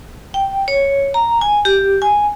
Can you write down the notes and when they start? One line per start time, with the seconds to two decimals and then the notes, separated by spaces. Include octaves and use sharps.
0.34 G5
0.68 C#5
1.14 A#5
1.41 G#5
1.65 G4
2.02 G#5